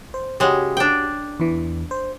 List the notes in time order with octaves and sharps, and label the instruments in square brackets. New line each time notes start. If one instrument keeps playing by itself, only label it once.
[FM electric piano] C5
[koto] C#3 G#3 [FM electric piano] F#4 G4
[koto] D4 G5
[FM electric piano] E2 E3
C5